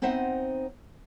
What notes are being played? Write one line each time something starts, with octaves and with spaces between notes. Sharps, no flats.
B3 C4 D#4 C5 E5 F#5